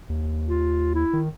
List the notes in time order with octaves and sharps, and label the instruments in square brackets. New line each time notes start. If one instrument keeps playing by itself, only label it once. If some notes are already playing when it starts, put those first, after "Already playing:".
[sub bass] D#2
[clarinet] F4
E4
[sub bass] D#3